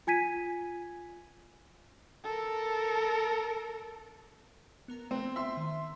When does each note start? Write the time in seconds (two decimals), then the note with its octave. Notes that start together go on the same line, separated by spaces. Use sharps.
0.07 F4 G#5 G#6 B6 D#7
2.24 A4 A#4
4.88 B3 A#4 A#5
5.11 A3 B3 C4
5.36 E5 C6
5.57 D#3